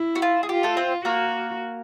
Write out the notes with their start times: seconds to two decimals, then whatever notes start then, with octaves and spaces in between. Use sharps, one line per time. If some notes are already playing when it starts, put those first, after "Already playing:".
Already playing: E4
0.15 F#4
0.22 F4
0.43 G#4
0.49 F4 G4
0.63 A3 A4
0.77 C4 C5
1.05 A#3 F#4 A#4